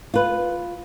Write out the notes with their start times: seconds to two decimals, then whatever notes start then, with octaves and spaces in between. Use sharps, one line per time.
0.14 F4 B4